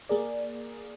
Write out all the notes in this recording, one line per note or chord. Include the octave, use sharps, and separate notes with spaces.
A#3 G#4 A#4 D5